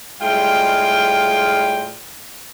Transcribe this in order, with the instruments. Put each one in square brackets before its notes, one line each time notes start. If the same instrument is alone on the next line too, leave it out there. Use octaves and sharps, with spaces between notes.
[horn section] A2 G3 G#3 F4 F5 G5